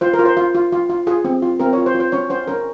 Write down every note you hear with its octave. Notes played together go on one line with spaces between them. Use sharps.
F4 C5
A#4
F4
C5
F4
F4
F4
F4
F4 G#4
C4
F4
C4 A#4
F4 C#5
C5
F4
C5
C#4 C#5
C#4 C5
C#4 A#4